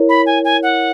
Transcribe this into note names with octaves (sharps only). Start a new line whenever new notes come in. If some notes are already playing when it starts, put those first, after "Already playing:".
Already playing: E4 A#4 C#5
B5
G#5
G#5
F#5